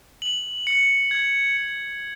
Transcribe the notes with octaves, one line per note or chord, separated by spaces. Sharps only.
F#7
C#7
G#6
C#7